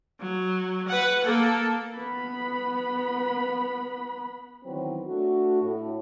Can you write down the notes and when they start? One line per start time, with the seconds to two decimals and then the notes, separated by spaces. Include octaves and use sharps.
0.20 F#3
0.88 B4 F#5
1.24 A#3 A4
1.97 B3 B5
4.64 D#3 E3 F#3 B3 C4
5.07 A3 D4 F#4
5.62 A2